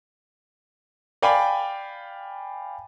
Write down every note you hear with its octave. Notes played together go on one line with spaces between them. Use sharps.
D5 F5 G5 G#5 B5